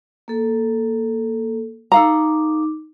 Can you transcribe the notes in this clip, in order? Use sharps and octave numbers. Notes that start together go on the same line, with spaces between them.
A#3 A4
D#4 A4 F5 A#5 D6